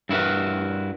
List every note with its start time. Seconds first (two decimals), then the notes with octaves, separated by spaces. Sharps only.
0.09 G2 E4 F#4 A#4 B4